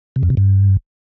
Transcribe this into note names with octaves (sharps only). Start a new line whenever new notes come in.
C3
F2
C3
G2